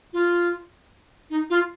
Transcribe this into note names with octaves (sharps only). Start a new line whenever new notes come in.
F4
D#4
F4